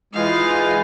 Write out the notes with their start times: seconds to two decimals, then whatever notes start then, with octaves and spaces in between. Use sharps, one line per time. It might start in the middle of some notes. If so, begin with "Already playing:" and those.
0.14 E3 G#3 D#4 F4 G#4 F5